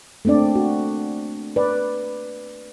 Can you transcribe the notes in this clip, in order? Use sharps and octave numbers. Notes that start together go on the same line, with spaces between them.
A3 A#3 C4 D4 D5
F#4
B4 D5